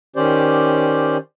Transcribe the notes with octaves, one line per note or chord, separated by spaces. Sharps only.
D#3 C#4 G4 C5 D5